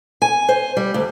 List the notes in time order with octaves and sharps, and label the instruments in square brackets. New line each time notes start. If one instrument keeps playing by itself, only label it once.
[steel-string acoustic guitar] G#5
C5
G3
D2